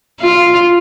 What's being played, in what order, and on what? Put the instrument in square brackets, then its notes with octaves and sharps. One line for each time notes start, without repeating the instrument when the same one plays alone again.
[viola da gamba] F4